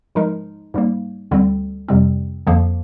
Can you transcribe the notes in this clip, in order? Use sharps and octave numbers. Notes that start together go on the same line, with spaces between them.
G#2 F3 G#3 D#4 A#4
G#2 G3 A#3
D2 D3 G3 C4
F2 C3 G3 C4
F2 D3 F3 A#3